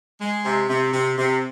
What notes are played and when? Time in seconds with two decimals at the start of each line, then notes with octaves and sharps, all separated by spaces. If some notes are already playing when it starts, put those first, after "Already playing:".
0.20 G#3
0.44 C3
0.69 C3
0.93 C3
1.17 C3